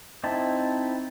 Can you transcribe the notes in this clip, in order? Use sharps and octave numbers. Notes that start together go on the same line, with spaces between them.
C4 D#4 E4 A5